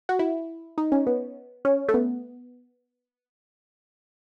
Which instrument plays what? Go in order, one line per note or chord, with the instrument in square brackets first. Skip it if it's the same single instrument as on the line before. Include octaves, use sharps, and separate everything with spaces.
[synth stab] F#4
E4
D#4
C#4
B3
C#4
A3
B3